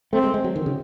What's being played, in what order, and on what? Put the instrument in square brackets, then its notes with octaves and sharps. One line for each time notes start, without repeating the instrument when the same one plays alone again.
[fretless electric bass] A3 [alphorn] C4
[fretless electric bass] G#3
G#3
F#3
D#3
C#3